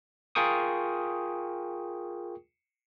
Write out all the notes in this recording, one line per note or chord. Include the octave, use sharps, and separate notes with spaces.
F4 G#4 A#4 G5 C#6 D#6